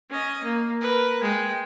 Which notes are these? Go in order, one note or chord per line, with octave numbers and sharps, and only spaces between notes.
C#4 D#5
A#3
A#4 B4
G#3 G5